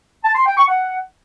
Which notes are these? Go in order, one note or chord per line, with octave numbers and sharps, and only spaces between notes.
A5
C6
G5
C#6
F#5